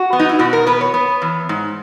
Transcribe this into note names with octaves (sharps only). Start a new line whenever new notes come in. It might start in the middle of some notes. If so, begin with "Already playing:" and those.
Already playing: F#4
B3
D#4
E4
B2 F#4
A#4
B3 B4
C#5
B3
E2
G#2